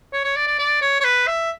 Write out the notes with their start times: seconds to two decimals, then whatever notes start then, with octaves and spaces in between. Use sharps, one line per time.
0.13 C#5
0.24 C#5
0.36 D5
0.47 D5
0.59 D5
0.82 C#5
1.01 C#5
1.04 B4
1.27 E5